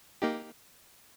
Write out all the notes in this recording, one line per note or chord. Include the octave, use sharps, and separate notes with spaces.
A#3 D#4 G4